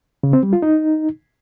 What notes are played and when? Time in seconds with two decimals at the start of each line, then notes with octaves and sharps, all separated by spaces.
0.23 C#3
0.33 C4
0.43 G3
0.53 F4
0.62 D#4